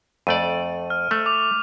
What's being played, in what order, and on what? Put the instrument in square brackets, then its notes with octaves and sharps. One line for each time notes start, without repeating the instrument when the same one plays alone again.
[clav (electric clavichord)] F2 A3 D5 [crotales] D#7
[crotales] F6
[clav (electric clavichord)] A3
[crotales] D6 F7